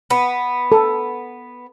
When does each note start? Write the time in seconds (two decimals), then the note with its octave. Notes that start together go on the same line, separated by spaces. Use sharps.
0.10 B3
0.72 A4